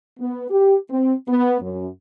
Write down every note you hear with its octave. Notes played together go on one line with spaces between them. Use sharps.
B3
G4
C4
B3
F#2